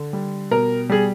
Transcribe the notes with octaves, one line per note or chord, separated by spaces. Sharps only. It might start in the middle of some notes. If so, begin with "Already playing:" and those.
Already playing: D3
G3
B2 A#4
G3 G#4